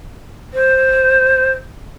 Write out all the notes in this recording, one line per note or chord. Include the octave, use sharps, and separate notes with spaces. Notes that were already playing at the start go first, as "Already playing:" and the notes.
C5